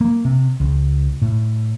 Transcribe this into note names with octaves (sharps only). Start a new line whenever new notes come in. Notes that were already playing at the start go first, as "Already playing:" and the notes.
A#3
C3
C#2
A2